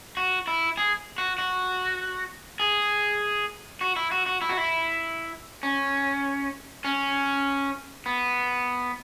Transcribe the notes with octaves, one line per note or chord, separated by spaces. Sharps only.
F#4
E4
G#4
F#4
F#4
G#4
F#4
E4
F#4
F#4
E4
F#4
E4
C#4
C#4
B3